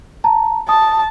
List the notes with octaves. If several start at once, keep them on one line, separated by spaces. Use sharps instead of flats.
A5 A#5
A5 D#6